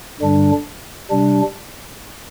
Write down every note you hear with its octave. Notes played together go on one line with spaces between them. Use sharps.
G2 D3 G3 D4
C3 G3 D4